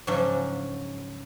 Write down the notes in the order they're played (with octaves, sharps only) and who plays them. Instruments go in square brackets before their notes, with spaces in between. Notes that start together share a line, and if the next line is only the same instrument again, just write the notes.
[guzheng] G#2 C#3 F3 F#3 C#4 D4